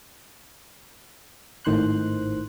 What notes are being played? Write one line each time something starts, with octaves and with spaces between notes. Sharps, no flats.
G#1 A2 D#3 C5 C6 F#6